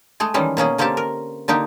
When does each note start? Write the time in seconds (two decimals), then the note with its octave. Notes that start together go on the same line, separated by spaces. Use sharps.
0.20 G#3 A3 G#4
0.34 D#3 E3 G3 G#3 C#4
0.57 B2 A#3 C#4 G#4
0.78 D3 A#3 C4 C#4 G4 A5
0.97 A#4
1.48 D3 A#3 D#4 G4